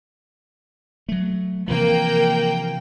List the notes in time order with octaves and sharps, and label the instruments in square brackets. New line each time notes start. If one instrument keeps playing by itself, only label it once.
[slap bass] F#3 A3
[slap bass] C3 E3 F3 [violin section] A#3 G5